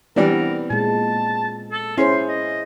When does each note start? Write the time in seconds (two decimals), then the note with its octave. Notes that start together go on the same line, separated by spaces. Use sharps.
0.16 E3 G3 B3 C4 D4 A#4
0.70 A#2 G#3 A5
1.71 A4
1.98 C#4 E4 G#4 C5 C6
2.28 D#5